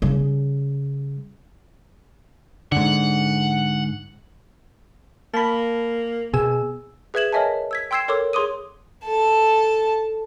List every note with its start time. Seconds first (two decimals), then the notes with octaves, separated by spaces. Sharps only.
0.02 C#3 G3
2.72 G#2 D3 F#5
5.34 A#3 A5 B5
6.34 B2 G#4 G#5 E6
7.14 G#4 B4 E5 G#6 E7 F#7
7.33 A#4 C#5 D#5 E5 G#5 A5
7.71 E6 G#6 B6
7.91 G5 C6 E6 G#6 C7 E7
8.08 A4 A#4 C#5 C6 D6 E6
8.33 G#4 C#5 C6 D6 D#6 D#7
9.05 A4 A5